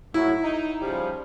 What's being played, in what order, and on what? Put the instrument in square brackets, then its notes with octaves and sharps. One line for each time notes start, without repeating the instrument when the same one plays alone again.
[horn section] A2 F#3 [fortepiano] E4
[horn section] D#4
C#3 F3 G3